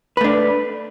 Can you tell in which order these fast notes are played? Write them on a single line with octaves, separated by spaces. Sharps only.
B4 A3 D4